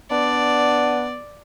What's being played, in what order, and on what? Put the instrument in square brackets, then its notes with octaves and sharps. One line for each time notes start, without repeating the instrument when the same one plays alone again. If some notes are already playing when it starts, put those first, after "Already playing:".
[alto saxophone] B3 [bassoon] D4 [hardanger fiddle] D5